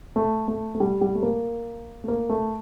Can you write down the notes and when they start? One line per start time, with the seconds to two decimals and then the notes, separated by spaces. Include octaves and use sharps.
0.16 A3
0.48 A3
0.75 A3
0.80 G3
1.01 G3
1.15 A3
1.23 A#3
2.04 A3
2.08 A#3
2.29 A3